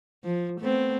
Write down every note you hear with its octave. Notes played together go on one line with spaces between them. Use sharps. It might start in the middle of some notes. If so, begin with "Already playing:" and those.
F3
A3 B3 C4